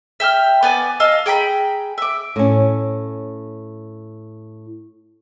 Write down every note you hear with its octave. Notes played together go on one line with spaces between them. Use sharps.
E5 G5 E6 F6
B3 D5 G#5
D#5 F5 A5 E6
G#4 G5 A#5 B5
E5 D6
A2 C#4